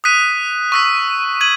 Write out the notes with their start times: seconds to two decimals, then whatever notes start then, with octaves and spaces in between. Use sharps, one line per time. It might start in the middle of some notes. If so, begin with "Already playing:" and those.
0.04 D#6 F#6 B6 D#7
0.72 C#6 E6 B6
1.41 G#6 D#7 F#7